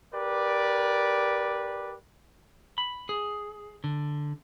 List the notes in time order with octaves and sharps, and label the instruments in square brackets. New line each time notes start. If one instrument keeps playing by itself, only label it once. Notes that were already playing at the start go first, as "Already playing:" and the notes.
[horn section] G4 A#4 B4 D5
[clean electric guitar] B5
G#4
D3